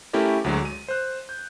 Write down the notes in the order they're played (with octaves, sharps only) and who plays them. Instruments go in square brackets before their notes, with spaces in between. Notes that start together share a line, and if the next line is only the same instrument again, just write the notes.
[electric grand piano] A3 C#4 E4 G4 A4 A#4
D2 F#3 G#3
D#7
C5 F#6
G6